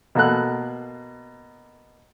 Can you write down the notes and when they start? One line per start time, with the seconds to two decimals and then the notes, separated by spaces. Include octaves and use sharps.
0.15 B2 A#3 A4 F#6